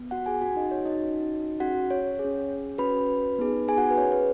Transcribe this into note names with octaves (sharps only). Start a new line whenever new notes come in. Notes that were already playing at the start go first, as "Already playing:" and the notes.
Already playing: B3
F#4 F#5
G#4 G#5
C#4 F#4 F#5
D#4 D#5
C#5
D#4 D#5
C#4 F#4
C#4 F#4 G#4 F#5
C#5
G#4
C#4
C#4 F#4 B4 B5
B3 D#4 G#4
G#4 G#5
F#4 F#5
B4
C#4 G#4 C#5
B4